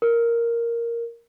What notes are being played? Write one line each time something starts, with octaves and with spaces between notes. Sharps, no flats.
A#4